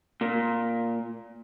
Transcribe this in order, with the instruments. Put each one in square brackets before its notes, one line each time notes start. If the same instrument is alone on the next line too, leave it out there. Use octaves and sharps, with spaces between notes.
[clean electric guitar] A#2